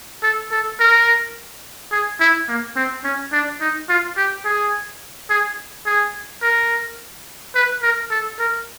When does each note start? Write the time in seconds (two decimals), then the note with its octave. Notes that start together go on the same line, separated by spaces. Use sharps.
0.23 A4
0.52 A4
0.80 A#4
1.92 G#4
2.21 E4
2.48 A#3
2.76 C4
3.05 C#4
3.33 D4
3.61 D#4
3.89 F4
4.17 G4
4.45 G#4
5.30 G#4
5.86 G#4
6.42 A#4
7.55 B4
7.83 A#4
8.11 A4
8.39 A#4